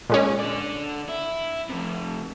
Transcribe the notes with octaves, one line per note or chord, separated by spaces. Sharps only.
A#2 G#3 C#4
D3 D5
E4
C3 F3